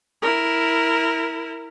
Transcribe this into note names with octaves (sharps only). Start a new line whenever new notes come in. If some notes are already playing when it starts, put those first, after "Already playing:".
E4 A#4